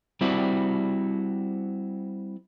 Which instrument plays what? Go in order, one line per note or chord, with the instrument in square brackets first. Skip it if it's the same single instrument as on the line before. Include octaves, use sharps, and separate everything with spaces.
[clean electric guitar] G3 C4 E4 F#4 D5